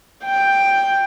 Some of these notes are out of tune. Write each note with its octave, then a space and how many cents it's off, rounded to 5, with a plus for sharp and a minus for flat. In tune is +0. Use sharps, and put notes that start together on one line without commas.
G5 +5